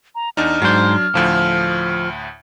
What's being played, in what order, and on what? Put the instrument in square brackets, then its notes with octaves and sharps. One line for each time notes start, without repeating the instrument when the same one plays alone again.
[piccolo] A#5
[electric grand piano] E2 D4 D#4 [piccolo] F6
[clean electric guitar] G#2 C5 [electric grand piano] F#3 D4
[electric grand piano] D2 A2 [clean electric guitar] F3